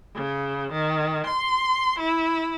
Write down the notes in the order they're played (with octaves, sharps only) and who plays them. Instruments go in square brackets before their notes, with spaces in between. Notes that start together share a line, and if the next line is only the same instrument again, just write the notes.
[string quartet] C#3
D#3
C6
E4